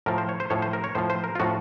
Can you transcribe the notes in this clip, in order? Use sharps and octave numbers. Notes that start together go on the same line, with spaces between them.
A2 F3 A#4
C5
C#5
C5
A2 F3 C#5
C5
A#4
C#5
A2 F3 C5
C5
A#4
F4
A2 F3 F#4